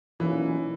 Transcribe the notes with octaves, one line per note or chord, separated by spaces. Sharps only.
B1 A#2 E3 A#3 C#4